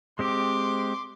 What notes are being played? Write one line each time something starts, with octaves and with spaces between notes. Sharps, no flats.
G#3 C4 G4 C6 D6